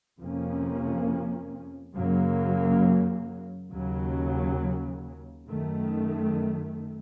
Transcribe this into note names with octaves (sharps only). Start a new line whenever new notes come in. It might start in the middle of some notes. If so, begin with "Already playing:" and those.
F2 C3 F3 A#3 C#4
F#2 C#3 F#3 A#3
D#2 C#3 F#3
F#2 D#3 A3